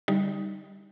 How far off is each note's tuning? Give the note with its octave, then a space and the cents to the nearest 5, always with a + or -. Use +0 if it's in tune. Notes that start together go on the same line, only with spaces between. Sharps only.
D3 -5 G3 +0 D#4 +0